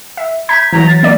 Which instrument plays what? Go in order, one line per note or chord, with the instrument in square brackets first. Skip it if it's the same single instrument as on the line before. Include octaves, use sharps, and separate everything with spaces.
[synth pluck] E5
[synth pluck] A#5 G6 B6 [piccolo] G#6
[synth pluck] E3 F#3 [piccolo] A#5
[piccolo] A6
[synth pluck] A#3 D5